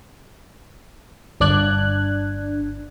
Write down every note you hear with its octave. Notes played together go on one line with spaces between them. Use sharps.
G1 D4 D5 F#6 G#6